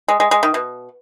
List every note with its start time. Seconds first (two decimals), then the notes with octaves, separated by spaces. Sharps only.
0.08 G#3
0.20 G#3
0.31 G#3
0.43 D#3
0.54 B2